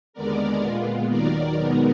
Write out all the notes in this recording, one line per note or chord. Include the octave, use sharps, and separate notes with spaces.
D#2 D3 G#3 B3 A#4 D5
A#2 G#3 B3 F4
D#2 D#3 F#3 A#4 D5
B2 G#3 B3 D#4 A#4